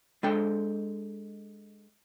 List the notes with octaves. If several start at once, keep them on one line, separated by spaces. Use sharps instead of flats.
G#3 D4 A4 G5